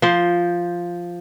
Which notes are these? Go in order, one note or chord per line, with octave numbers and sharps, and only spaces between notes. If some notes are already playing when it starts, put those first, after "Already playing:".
F3 C5